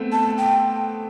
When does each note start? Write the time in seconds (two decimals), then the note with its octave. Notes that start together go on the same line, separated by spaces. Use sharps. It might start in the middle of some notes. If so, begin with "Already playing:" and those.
Already playing: A3 B3 C4
0.12 A5
0.38 G5